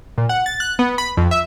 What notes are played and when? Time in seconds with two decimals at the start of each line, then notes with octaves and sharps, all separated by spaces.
0.18 A#2
0.29 F#5
0.46 A6
0.60 F#6
0.79 B3
0.98 B5
1.17 F2
1.31 E5